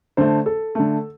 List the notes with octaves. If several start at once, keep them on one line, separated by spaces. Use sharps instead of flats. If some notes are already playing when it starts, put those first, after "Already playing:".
D3 A3 C5
A4
D3 A3